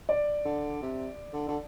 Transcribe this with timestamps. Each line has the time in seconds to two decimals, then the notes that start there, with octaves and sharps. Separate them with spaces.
0.09 D5
0.45 D3
0.82 C3
1.33 D3
1.48 D3